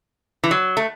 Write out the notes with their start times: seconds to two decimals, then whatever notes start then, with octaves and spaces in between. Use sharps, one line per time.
0.44 E3
0.51 F#3
0.77 A3